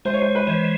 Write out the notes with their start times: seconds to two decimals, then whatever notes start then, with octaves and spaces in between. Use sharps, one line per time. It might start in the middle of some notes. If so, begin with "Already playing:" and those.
0.05 G#3 C5
0.13 C#5
0.22 C5
0.35 B4
0.47 E3 C5